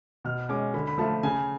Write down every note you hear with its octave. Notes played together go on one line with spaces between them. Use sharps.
B2 F6
G#3 C#4 D6
D3 B5
B5
F3 A3 F4 A5
C#3 G#5